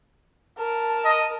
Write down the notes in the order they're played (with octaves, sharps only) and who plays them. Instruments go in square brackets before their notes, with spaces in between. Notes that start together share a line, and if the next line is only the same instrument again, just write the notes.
[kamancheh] A#4 A5
[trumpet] D#5